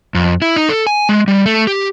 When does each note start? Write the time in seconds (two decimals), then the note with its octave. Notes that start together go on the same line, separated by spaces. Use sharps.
0.15 F2
0.42 E4
0.56 D#4
0.69 A4
0.87 G#5
1.09 G#3
1.28 G3
1.46 A3
1.67 G4